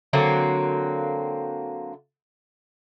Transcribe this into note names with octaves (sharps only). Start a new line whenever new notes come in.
D3 F#3 A#3 C4